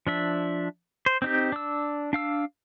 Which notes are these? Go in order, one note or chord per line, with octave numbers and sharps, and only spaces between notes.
F3 D4 E5
C5
C4 D#4 G4
D4 E6
D4 F5 E6